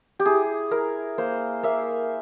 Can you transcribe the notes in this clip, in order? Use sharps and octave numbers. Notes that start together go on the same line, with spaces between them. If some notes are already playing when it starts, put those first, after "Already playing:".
G4
E4 G#4
E4 A#4
A#3 C5
A#3 E5